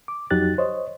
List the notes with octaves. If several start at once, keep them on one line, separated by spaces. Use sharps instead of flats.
D6
F2 F#3 D#4 G4 F#6 A6
C5 C#5 D#5